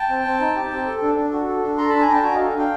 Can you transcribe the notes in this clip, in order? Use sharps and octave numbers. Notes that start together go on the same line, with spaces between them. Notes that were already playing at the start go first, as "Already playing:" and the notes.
Already playing: G5 A5
C4
C4
D#4
G4
C4
A4
D4
D4
F#4
A4
D4
A4 A#5 C6
D4 A5 B5
G#5 A#5
D4 G5 A5
F#4 G#5 A#5
A4 D#5 F5
D4 F5 G5